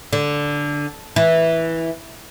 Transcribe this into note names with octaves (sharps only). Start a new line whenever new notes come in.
D3
E3